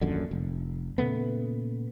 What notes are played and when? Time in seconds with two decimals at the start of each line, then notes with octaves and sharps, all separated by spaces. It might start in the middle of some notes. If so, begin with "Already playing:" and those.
0.01 D#1 A#1 F#2 D3
0.31 F1
0.98 A#2 C#3 A3 B3